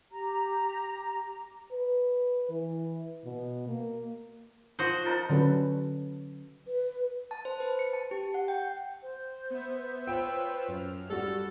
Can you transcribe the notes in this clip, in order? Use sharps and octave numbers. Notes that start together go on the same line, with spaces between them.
G4 A#5
B4
E3
B2
A#3
F3 F#4 C5 D#6
D#4 A#4 A5
D3 F#3 C#4 A4 B4
B4
A5
C5
B4
C#7
A5
G4
F#5
G5
C5
B3 E5
F4 B4 C#5 G5 E6
F#2 F6
G3 F#4 A4